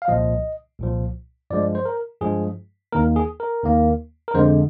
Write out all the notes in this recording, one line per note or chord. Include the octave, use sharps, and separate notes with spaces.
F5
C2 A#2 F3 D#5
C2 A#2 F3
G2 F3 G#3 D5
C5
A#4
G2 F3 G#3 G#4
D#2 D#3 A#3 A#4
G#4
A#4
D#2 D#3 A#3
A#4
F2 D3 G#3 C5